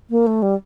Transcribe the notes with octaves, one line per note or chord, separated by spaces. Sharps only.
A#3
A3
G3